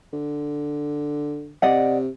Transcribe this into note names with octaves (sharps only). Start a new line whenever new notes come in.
D3
C3 D5 D#5 F#5